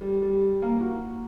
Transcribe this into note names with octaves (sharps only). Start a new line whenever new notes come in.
G3
G3
A#3
F#4